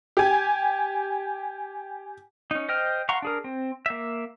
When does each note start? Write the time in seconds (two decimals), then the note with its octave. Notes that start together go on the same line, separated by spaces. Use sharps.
0.17 G4 G#5
2.51 C#4 D#4
2.69 C5 D#5 G5 F6
3.09 F5 F#5 A#5 C6 C#6
3.22 D4 G#4 A#4
3.44 C4
3.86 A#3 E5